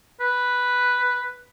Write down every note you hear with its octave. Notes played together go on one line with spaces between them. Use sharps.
B4